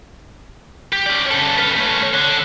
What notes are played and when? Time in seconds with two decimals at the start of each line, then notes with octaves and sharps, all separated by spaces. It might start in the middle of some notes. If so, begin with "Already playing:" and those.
0.93 G4
1.06 C#4 D5
1.31 C#3 A4
1.58 B4 F5
1.76 A3 C#4
2.14 D3